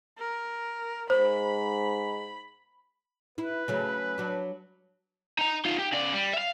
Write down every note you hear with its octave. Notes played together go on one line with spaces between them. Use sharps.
A#4
G#2 C5 B5
E4 B4
C#3 F#3 A3
F#3 D4
D#4 A#5
D#4 F4
G4
C#3 D5
G3
E5 F5